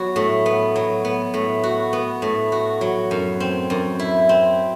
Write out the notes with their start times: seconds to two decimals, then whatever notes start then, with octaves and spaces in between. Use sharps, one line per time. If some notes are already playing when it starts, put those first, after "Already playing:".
Already playing: F#3 B3 F#4
0.16 A2
0.46 B3
0.76 F#3
1.05 B3
1.34 A2
1.63 F#4
1.93 B3
2.22 A2
2.52 F#4
2.81 F#3
3.11 F#2
3.40 C4
3.70 F#2
4.00 E4
4.29 C4